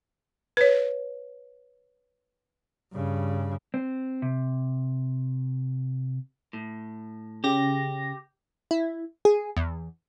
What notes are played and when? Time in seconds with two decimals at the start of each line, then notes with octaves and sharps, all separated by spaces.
0.57 B4 C#5
2.93 G2 C#3
3.74 C4
4.22 C3
6.53 A2
7.44 C#3 G4 A#6
8.71 E4
9.25 G#4
9.57 E2